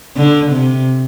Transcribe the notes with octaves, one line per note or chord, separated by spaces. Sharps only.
D3
C3